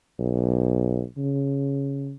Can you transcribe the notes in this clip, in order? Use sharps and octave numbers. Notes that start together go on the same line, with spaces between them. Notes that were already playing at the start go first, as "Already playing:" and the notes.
B1
C#3